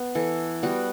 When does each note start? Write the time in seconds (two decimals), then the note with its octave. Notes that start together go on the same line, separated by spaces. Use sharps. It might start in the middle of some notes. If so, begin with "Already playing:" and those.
Already playing: B3
0.15 E3 A4
0.63 G3 B3 F#4